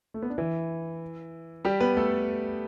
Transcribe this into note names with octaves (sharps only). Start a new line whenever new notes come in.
A3
B3
D4
E3 E4
G3 G4
B3 B4
A3 A4